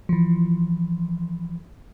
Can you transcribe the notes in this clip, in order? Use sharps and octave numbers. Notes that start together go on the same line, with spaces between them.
E3 F3